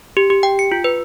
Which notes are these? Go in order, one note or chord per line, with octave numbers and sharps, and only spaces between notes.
G4
G4
G5
C#7
F4
B4